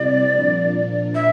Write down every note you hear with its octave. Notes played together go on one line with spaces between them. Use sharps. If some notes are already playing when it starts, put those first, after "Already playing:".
Already playing: C3 G3 C4 E4 G4 D5
A#2 F3 A#3 D4
E5